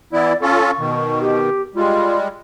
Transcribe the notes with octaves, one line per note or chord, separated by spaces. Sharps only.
E3 B3 E4 D5
C#4 F4 A4 C#6
B2 D#3
G4
G3 G#3 F4